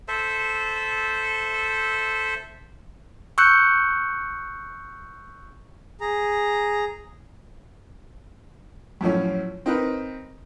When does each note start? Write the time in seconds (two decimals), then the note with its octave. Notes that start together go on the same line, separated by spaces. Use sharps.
0.08 A4 C5 E5
3.38 C#6 E6 F#6 G6 C#7
6.01 G#4 A#5
9.01 F#2 A2 F3 C#4
9.66 C4 D#4 A#4 B4